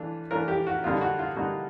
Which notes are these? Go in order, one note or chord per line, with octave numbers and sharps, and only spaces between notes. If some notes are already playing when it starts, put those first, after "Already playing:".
Already playing: E3 A3 D4 F4
E3 A3 D4 F4 A#4
G4
F#4
D3 G3 A#3 D#4 F4
F#4
F4
D3 G3 A#3 D#4 F#4